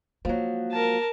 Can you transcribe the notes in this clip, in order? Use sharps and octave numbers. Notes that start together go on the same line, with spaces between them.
F3 F#3 G#3 A#3
A#4 A5